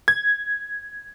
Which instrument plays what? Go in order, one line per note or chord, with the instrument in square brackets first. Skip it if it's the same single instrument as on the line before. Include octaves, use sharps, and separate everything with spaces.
[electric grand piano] G#6